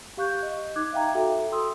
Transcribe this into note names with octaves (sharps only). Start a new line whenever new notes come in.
G4 F5 C#6 F#6 G6
D#5
D#4 D6 F#6 G#6
E5 F5 G5 A#5
F#4 A4 E5 G5
A4 C6 D#6 E6